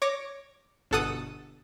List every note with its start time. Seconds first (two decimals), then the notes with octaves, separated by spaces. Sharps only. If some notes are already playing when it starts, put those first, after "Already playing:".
0.02 C#5 D6 A#6
0.91 G1 B2 A4 F#5 D#6 D#7